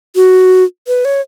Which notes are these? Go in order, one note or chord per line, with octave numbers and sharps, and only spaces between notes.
F#4
B4
C#5